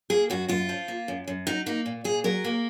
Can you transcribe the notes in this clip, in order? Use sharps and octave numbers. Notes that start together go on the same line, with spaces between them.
A#3 G#4
F#2 F#4
F#2 F4
F3
A#3
F#2
F#2
F#3 D#4
A#3 D#4
A#2
A#2 G#4
F#3 A#4
A#3